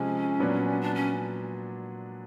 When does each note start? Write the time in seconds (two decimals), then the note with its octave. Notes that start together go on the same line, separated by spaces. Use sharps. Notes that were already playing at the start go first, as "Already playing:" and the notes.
Already playing: C3 F3 G#3 C#4
0.39 A#2 F#3 B3 D4
0.81 D4
0.95 C#4